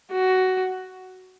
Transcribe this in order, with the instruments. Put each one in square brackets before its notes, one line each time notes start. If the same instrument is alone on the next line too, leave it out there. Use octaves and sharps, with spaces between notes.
[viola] F#4